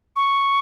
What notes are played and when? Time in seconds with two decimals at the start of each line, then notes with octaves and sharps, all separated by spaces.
0.16 C#6